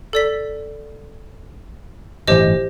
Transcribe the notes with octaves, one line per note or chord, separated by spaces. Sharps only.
A4 D5 B6
G1 A2 E3 G4 C5 D#5